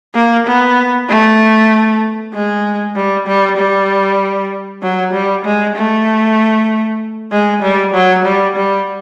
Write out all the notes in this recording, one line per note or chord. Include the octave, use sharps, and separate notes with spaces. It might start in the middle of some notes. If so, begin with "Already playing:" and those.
A#3
B3
A3
G#3
G3
G3
G3
F#3
G3
G#3
A3
G#3
G3
F#3
G3
G3